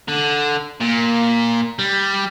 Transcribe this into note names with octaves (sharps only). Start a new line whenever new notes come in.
D3
A#2
G3